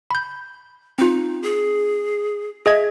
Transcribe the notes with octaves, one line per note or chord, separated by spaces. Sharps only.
B5 G6
C4 D#4 F4
G#4
G#4 D#5 E5 G#6